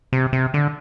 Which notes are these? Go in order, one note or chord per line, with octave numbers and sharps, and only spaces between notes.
C3
C3
D3